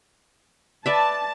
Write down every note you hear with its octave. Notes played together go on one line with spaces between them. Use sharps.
B4 D5 E5 A5